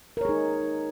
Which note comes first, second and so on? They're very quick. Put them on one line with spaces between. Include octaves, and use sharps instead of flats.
A#4 C#5 G#4 D#4